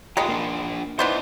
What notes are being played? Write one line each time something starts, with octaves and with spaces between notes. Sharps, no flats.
D#3 G#3 B3 F4 G4
A#3 D4
E3 B3 D#4 C5 D5 D#5